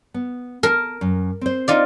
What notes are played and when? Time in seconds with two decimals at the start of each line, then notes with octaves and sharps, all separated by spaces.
0.14 B3
0.63 A#4 A5
1.01 F#2
1.41 C4 C5
1.68 D#4 F4 D5